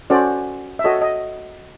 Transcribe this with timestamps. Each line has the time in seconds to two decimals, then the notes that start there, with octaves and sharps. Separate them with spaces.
0.10 C#4 F#4 A4 C5 D5
0.79 E5
0.84 F#4 A4 C#5 D#5
1.02 D#5